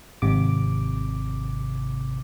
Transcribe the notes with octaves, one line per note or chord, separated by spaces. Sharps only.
G#1 C3 D6